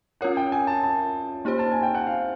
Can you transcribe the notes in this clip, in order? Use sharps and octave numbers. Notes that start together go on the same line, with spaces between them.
C#4 F4 A#4 C#5 F#5
G5
G#5
A5
A5
A#3 D#4 G4 C5
A5
G#5
G5
F#5
F5